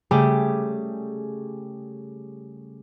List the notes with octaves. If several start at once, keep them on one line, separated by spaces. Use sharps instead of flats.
C#3 G3 A3 G4 G#4